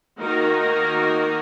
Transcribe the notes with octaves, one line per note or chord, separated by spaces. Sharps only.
D#3 A#3 D#4 F#4 A#4